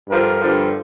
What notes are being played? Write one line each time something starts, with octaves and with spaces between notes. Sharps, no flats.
G2 D3 F3 A#4
G2 D3 F3